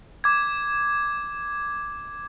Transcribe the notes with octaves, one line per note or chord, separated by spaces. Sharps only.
D6 G#6